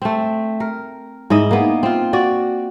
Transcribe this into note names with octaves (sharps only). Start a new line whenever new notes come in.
A3 C4
A#4
G#2 E4 D#5
A#3 B3
C4 F4
F#4 D5